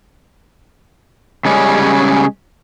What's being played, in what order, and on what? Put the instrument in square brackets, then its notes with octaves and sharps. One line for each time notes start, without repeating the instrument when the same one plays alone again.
[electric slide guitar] C#3 G3 G#3 C#4